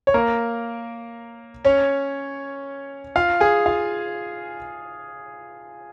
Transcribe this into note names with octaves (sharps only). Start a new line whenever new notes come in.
C#5
A#3 A#4
C#4 C#5
F4 F5
G#4 G#5
F4 F5